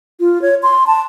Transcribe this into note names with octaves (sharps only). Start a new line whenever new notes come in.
F4
C#5
C6
A5